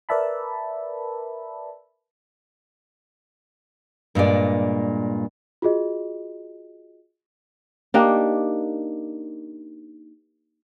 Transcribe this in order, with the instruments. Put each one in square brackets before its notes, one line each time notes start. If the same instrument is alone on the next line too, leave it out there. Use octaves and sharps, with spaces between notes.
[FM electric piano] A#4 B4 D5 E5 A5 B5
[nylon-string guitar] G2 A#2 G#3 D5
[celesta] F4 F#4 G#4 D#5
[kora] A#3 D4 D#4 G4